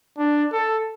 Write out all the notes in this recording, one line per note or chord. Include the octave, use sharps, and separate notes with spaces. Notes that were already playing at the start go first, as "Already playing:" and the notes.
D4
A4